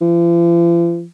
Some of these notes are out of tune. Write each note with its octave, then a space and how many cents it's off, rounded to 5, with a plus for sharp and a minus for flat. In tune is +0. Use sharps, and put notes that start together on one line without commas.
F3 -45